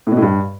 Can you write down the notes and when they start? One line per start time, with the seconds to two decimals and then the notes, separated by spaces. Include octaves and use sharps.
0.07 A2
0.12 B2
0.17 A2
0.22 G2